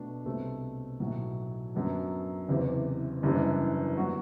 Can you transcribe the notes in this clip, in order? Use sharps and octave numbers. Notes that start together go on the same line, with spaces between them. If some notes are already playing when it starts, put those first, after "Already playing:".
Already playing: B2 A3 D4 F#4
C2 B2 A3 C4
B1 A2 F#3
F#2 F#3 B3 D4
F#1 E2 C3 E3
F#1 F#2 E3 G3 D4
F#3 B3 F#4